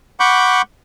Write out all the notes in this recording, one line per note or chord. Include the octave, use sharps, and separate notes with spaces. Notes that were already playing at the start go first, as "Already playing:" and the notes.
F#5 B5 C#6 D6 G6